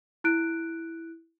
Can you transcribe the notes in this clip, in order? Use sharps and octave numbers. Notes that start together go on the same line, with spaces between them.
E4 F#6 D7